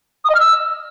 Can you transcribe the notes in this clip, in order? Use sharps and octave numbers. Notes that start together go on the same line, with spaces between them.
D#6
D#5
F6
E6